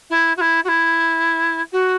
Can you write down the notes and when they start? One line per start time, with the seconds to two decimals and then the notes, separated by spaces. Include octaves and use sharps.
0.10 E4
0.37 F#4
0.40 E4
0.64 F#4
0.68 E4
1.72 F#4